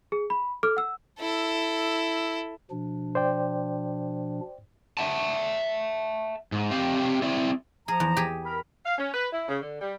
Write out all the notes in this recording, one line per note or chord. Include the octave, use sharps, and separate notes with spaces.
G#4
B5
A4 D6 F6
F#5 E6
E4 A4
B2 F3 D4
C5 D5 G5
E5 F#5 A5
G#2
C4 G4 F5
C4 E4 D5
F3 G#4 A#5
E2
G4 G#4
A#4 B5
F5
C#4
B4
E4
C#3
D3
G3